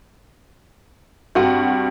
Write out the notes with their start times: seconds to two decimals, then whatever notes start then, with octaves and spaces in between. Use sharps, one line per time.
1.35 G2 C4 F#4 G5